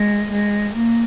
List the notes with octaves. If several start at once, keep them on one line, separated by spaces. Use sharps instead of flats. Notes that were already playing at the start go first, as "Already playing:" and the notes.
Already playing: G#3
G#3
A#3